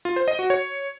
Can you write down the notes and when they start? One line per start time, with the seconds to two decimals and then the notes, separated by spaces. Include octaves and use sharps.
0.05 F4
0.16 C5
0.28 D#5
0.39 F#4
0.50 C#5